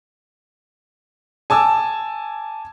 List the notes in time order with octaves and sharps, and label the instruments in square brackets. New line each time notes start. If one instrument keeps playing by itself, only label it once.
[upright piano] G#5 A5 D6 E6